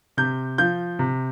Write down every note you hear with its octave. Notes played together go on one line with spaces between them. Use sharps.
C3 G6
F3 G6
C3